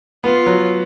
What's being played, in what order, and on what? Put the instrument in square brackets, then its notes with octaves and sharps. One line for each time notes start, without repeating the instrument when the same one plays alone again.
[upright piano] B3 [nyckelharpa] F4
[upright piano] F#3